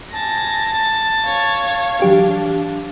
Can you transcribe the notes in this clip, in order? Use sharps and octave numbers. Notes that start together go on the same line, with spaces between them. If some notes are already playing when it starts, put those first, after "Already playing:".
G#5 A5 A#6
C#5 F5
E3 F#3 D4 G4